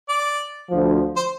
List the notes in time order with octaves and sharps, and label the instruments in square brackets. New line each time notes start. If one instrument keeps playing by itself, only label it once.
[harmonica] D5
[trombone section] D2 D3 F3
[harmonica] C5